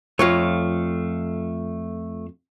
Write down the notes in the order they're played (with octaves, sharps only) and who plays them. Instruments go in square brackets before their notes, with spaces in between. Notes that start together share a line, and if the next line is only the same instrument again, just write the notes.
[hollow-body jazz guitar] F2 F4 C#5 [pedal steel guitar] A3 F5